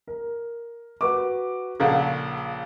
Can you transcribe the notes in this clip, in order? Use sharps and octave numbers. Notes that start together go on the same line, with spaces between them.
A#4
F#4 B4 D6
A#1 A#2 C#3 A4 F5 F#5